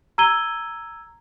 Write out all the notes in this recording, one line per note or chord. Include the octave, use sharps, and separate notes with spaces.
A#5 E6 G#6 D#7 G7